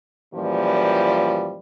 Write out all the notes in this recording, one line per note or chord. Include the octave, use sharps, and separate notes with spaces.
F#2 A#2 E3 F3 G3